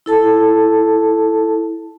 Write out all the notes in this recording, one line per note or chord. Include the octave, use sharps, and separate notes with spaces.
E4 A4 A5